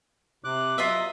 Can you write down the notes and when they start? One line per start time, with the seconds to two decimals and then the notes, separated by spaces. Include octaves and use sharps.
0.44 C3 D6 F#6
0.78 F#3 F4 D#5 E5